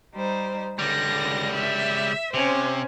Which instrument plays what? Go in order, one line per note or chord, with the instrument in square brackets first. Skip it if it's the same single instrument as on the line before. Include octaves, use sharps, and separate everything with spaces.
[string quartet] G3 D#4 C5
[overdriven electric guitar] C#2 G3 [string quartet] D3 A#6
[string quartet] E5
[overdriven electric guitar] C3 [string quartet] C#4 C5